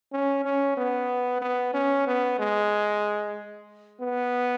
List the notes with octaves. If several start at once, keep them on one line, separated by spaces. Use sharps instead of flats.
C#4
C#4
B3
B3
C#4
B3
G#3
B3